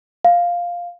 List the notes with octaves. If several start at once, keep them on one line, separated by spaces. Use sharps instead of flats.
F5